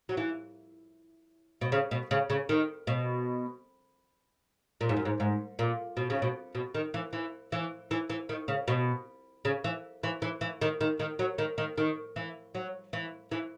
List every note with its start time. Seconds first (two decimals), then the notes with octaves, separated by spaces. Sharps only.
0.09 F#3
0.17 E3
1.61 B2
1.72 C#3
1.91 B2
2.11 C#3
2.30 C#3
2.49 D#3
2.87 B2
4.81 A#2
4.89 G#2
4.97 F#2
5.05 G#2
5.20 G#2
5.59 A#2
5.97 B2
6.10 C#3
6.22 B2
6.55 B2
6.75 D#3
6.94 E3
7.13 E3
7.52 E3
7.91 E3
8.10 E3
8.29 D#3
8.48 C#3
8.68 B2
9.45 C#3
9.64 E3
10.03 E3
10.22 E3
10.41 E3
10.61 D#3
10.81 D#3
11.00 D#3
11.19 F#3
11.38 D#3
11.58 D#3
11.78 D#3
12.16 E3
12.55 F#3
12.93 E3
13.31 E3